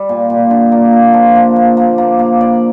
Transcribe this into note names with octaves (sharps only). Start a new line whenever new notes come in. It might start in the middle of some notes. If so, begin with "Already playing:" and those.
Already playing: G3
A#2
A#2
D3
A#3
A#3
F3
A#3
A#3
A#3
A#3
A#3
D5